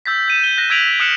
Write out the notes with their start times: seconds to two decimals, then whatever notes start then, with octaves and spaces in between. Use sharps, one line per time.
0.06 E6 G6 A6 B6
0.28 G6 D#7 E7
0.44 G7
0.57 F#6 A#6 D#7
0.70 E6 G#6 B6 D7 F7 F#7
1.00 D#6 F6 F#6 C#7 E7 F#7